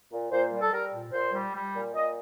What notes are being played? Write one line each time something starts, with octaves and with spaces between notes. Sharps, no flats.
A#2
A#2 C5
G3
A4
G3 A#4
A#2
A#2 C5
G3
G3
A#2
A#2 D#5